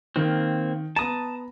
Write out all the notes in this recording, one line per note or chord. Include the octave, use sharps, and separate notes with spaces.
D#3 A#3 C4
B3 A5 A#5 D#6